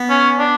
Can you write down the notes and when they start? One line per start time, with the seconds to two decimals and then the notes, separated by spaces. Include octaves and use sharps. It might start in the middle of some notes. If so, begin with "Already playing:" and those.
Already playing: B3
0.10 C#4
0.39 D4